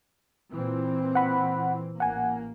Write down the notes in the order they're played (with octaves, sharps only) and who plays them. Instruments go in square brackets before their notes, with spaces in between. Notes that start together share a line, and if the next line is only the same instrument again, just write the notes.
[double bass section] A#2 E3 C4
[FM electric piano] F#5 B5
[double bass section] A1 A#3 [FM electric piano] F#5 G#5